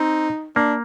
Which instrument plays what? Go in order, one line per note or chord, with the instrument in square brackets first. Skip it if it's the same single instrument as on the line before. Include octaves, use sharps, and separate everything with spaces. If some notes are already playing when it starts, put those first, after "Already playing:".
Already playing: [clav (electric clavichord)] C4 [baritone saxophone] D#4
[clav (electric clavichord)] A#3 [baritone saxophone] D4